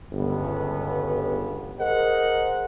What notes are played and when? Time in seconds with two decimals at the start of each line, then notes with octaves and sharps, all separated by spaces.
0.13 G1 C#2 B3
1.80 G#4 A#4 C5 D#5 F#5